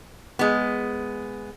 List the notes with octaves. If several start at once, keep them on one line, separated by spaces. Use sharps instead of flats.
G#3 B3